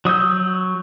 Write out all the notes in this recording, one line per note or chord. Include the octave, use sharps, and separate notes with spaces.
F#3 D#6 E6 G6